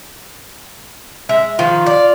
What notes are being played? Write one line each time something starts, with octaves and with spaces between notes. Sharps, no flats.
G#3 E5
D#3 F3 F4
D5